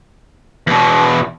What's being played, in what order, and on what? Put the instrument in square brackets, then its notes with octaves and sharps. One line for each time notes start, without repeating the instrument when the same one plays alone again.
[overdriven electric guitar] E2 B2